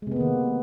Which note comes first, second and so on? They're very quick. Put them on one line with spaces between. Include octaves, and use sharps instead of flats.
G#3 C3 B3 A#3 D#3